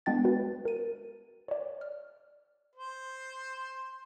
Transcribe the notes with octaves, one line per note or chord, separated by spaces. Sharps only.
G#3 B3 D4 G5 A6
F#4 B4
A#4 D#7
C#5 D5
F6
C5